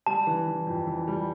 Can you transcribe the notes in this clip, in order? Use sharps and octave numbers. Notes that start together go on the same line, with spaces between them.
G3 A5
E3
E3
F2
E3
G3